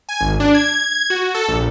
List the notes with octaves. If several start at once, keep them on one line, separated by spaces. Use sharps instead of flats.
G#5
G#1
D4
G#6
G#6
F#4
A4
A#1